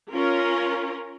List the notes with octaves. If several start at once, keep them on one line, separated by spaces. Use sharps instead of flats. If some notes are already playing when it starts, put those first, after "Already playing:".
C#4 F4 A#4